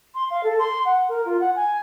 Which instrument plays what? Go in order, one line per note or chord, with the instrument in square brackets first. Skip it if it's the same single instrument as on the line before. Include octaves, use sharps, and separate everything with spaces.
[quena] C6
F5
A4
C6
F#5
A#4
F4
F#5
G#5